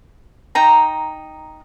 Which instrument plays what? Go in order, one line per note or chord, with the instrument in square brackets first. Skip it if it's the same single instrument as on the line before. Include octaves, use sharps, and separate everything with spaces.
[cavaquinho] D#4 G5 A#5